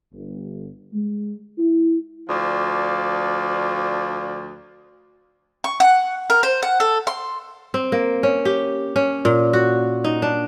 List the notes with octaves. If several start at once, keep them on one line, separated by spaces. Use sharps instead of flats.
G1
G#3
E4
D2 F3 D5
C#6
F#5
A#4
C5
F#5
A4
C6
C4
A#3
C#4
G4
C#4
A#2
F#4
D#4
D4